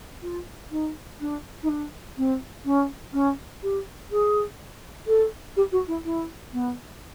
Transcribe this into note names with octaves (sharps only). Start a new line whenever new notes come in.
F4
D#4
D4
D#4
D4
C4
C#4
C#4
G4
G#4
A4
G4
F#4
E4
E4
B3